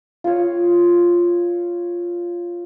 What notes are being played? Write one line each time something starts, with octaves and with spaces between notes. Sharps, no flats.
F4 C#5